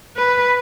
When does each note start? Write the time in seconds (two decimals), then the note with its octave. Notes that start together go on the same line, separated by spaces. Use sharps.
0.17 B4